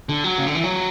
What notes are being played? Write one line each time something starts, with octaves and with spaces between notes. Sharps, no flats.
D3
F#3
C#3
D3
E3
F#3